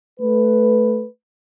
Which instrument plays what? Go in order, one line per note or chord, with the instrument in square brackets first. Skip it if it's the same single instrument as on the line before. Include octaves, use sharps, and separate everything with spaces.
[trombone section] A3 B4